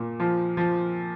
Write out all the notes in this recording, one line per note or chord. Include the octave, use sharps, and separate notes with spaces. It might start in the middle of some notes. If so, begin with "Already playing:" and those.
Already playing: A#2
F3
F3